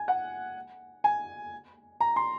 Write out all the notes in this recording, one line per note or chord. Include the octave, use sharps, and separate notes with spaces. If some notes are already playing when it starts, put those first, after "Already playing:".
Already playing: G#5
F#5
G#5
A#5
C6